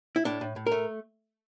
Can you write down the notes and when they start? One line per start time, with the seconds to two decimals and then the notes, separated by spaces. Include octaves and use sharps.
0.16 E4
0.25 A2 D4
0.41 A2
0.56 A2
0.67 A#4
0.72 A3